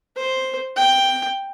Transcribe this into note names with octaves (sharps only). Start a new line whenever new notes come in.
C5
G5